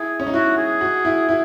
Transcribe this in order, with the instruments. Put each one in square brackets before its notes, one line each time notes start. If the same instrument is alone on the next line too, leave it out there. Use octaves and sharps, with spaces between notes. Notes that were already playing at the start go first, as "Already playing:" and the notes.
Already playing: [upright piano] E4 [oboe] G#4
[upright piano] C#4
D#4
[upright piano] E4 [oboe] F#4
[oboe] G#4
[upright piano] F#4
E4
E4